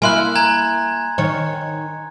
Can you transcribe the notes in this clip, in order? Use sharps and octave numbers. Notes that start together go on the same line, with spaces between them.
A#3 E4 G#5 C6 F#6
G#5 A#5 G#6
D#3 C#5